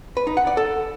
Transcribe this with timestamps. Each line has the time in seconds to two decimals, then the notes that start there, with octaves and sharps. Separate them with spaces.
0.17 B4
0.27 D#4
0.37 F#5
0.47 D5
0.57 A4